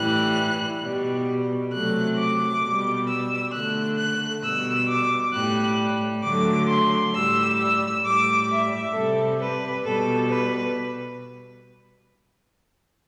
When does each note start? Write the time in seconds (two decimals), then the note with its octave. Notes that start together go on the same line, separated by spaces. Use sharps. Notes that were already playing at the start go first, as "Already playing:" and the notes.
Already playing: A2 E3 G3 F#6
0.82 B2 G3
1.73 C3 F#3 A3 F#6
2.18 D6
2.63 B2 G3
3.08 E6
3.53 D3 A3 F#6
3.98 F#6
4.44 B2 G3 E6
4.88 D6
5.33 A2 G3 F#6
6.24 D3 F#3 A3 D6
6.69 C6
7.14 A2 G3 E6
7.59 E6
8.04 A2 G3 D6
8.50 E5
8.94 C3 G3 A4
9.40 B4
9.85 B2 G3 A4
10.30 B4